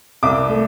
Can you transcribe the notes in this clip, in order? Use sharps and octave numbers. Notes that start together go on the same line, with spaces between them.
C2 D6
A3